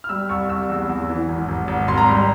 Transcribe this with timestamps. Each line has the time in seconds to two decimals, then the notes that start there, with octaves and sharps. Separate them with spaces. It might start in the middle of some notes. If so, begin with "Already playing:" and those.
0.04 F6
0.09 G3 E6
0.29 C2 C#6
0.49 C2 E6
0.70 E2
0.89 E2
1.09 E3
1.29 G#1
1.49 G#1
1.68 G#1
1.88 G#1 C6
1.98 A#5
2.06 G3 C6